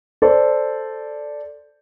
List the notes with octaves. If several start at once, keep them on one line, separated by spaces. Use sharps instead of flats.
A4 C5 D5